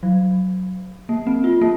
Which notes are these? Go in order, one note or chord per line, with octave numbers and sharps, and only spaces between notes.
F#3
A#3
C4
F4
A#3